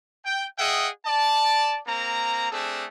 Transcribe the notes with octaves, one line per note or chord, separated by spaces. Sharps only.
G5
G#4 D#5 E5 F#5 G5
D5 A5
A#3 C4 A#5
A3 C4 D4 G#4 A4